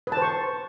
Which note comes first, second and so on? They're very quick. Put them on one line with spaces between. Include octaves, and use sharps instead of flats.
B4 A5 C5 C#6